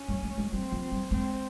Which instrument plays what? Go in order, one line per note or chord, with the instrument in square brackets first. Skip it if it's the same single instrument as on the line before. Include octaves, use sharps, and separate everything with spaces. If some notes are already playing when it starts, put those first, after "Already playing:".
Already playing: [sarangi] C#4
[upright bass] G3
G#3
G#3
[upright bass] G3 [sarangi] C4
[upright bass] F3
[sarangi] C4
[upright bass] G3
[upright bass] G#3 [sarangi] C4